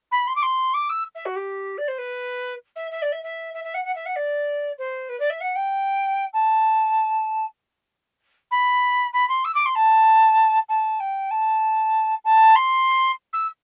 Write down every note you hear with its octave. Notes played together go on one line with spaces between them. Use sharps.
B5
C6
D6
C6
D6
E6
E5
F#4
G4
D5
C5
B4
E5
E5
D5
E5
E5
E5
E5
F#5
F#5
E5
F#5
D5
C5
B4
D5
E5
F#5
G5
A5
B5
B5
C6
E6
D6
C6
A5
A5
G5
A5
A5
C6
E6